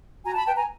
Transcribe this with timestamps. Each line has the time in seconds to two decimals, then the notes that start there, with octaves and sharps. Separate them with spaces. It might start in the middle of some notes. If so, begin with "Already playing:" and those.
0.24 F#4 G#5 A#5
0.35 A5 B5
0.45 B4 G5 A5
0.55 G#5 A#5